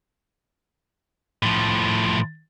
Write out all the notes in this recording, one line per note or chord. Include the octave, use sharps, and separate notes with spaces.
A2 F3